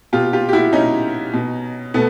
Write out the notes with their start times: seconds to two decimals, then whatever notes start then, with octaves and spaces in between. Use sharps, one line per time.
0.13 B2 F4 G4
0.33 F4 G4
0.49 G4
0.53 E4 F#4
0.73 B2 C#4 D#4
1.33 B2
1.94 B2 A3 B3